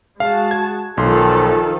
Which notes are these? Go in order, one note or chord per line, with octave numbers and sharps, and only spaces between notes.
G#3 F#4 F5 A5
G#6
B1 D#3 F3 A4 C6